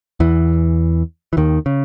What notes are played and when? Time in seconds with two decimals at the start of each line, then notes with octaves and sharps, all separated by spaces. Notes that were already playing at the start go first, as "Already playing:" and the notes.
0.20 E2 E3
1.33 E3
1.37 D#2 D#3
1.66 C#3